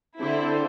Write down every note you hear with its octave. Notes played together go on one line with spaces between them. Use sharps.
D3 C4 E4 A4 C5